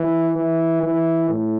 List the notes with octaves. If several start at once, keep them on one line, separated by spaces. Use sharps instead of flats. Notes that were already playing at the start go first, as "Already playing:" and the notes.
Already playing: E3
E3
E3
A2